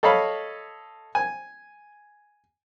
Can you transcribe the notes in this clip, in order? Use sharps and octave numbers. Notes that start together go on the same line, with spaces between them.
A4 C#5 D#5 F5 B5
G#5